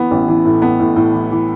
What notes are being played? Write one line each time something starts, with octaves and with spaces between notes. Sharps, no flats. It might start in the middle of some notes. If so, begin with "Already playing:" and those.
Already playing: E3 B3
A1
E3
A2
B3
A2
A2
E3
E3